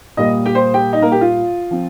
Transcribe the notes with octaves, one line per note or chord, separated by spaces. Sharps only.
A#2 G3 A#3 D#5 D#6
G4 G5
C5 C6
G4 G5
D#4 D#5
A#3 A#4
G4
F4
F3 C4